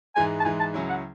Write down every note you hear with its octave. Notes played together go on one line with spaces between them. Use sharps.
G#2 E3 G#3 G#5
A5
G#2 E3 G#3 G#5
A5
C#2 C#3 F#3 C#4 E4
F#5